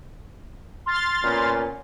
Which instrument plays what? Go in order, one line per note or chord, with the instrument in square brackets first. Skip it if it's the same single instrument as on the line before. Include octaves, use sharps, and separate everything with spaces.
[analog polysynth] C6 F6 A6
[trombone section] A#2 B3 C#4